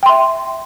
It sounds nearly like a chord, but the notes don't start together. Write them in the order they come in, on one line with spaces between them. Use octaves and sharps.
G5 C6 E5